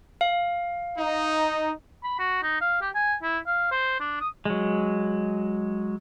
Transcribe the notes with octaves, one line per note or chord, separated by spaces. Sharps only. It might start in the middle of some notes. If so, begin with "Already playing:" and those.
F5
D#4
B5
F#4
D#4
F5
G4
G#5
E4
F5
C5
D4
D#6
F#3 G#3